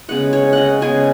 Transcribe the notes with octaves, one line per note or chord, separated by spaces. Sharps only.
C#3 G#3 B3 F#5
C#5
D#5 F#5
C#3 G#3 B3 G#5